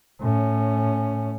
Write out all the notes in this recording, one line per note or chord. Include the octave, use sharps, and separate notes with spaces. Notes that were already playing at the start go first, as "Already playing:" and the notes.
A2 C#4